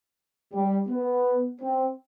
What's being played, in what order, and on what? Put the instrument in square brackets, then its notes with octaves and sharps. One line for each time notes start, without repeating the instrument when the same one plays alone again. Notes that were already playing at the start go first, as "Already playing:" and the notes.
[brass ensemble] G3
B3
C4